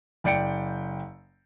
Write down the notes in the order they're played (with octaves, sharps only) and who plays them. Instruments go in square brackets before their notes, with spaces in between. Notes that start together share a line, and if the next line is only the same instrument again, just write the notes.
[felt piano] F#1 D5 G5 C#7 D7